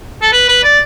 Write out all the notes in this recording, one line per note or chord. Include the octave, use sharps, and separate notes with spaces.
A4
B4
B4
D5